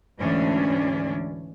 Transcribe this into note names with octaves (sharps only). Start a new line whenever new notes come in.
D2 G#2 E3 C#4 D4